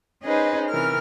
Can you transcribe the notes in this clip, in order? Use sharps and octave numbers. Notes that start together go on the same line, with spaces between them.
C#4 D#4 G#4 B4 C5 D#5
C3 E3 A#4 F6